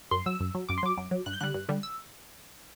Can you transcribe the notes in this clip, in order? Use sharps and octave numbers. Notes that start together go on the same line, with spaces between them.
F#2 C6
F#3 E6
F#2
F#3
F#2 D6
C6
F#3 D6
F#2
F#3
G2 F#6
G6
D3 G3 F#6
G2
D3 G3
E6